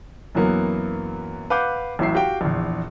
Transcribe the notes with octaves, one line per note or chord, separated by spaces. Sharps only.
F#2 E3 F#3 A#3 B3
B4 F5 F#5 D6 G6
A1 A2 F#3 E5 C7
F#4 G4 F5 G5
A#1 E2